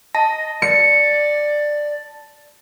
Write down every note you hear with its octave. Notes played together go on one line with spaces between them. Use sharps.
D#5 A5 A#6
D5 C#7